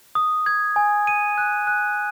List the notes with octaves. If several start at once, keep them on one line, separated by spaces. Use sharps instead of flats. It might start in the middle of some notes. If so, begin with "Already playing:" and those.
D#6
G#6
G#5
D#7
F#6
F#6